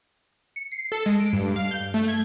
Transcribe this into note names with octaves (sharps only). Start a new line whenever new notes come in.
C#7
C7
A4
G#3
D7
G2
F5
G6
A3
G#6